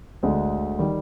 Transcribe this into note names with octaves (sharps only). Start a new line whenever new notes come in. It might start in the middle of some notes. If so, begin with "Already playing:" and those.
D2 D3 G#3
D#3 G3